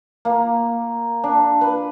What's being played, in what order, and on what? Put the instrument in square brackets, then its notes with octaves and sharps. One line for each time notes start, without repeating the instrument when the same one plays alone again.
[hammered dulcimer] A#3
D4
B4